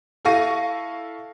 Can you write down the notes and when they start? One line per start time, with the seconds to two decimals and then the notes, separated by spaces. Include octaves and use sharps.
0.25 E4 A4 F5 C#6 A#6 D#7